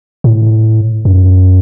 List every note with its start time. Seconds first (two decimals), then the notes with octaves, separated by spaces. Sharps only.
0.24 A2
1.05 F#2